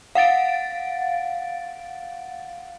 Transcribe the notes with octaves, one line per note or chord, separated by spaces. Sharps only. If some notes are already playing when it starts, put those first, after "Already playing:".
F5 F#5 A6 D7